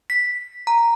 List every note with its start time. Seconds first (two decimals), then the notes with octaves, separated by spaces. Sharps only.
0.10 B6
0.67 A#5